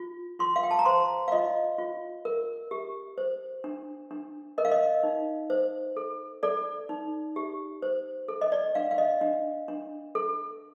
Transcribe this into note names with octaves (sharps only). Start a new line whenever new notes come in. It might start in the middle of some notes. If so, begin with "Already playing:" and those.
Already playing: F4
F4 C6
F5
G5
A5
A#5
C5 C6
F5
F4 D#5
F4
A#4
G4
C5
D4
D4
A#4 D#5
F5
D#5
D#4
C5
A4
A4 D5
D#4
G4
C5
A4
D#5
D5
D4 F5
F5
D#5
D4
D4
A4